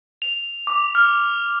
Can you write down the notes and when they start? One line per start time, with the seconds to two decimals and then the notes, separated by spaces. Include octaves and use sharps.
0.22 F7
0.67 D6
0.95 F6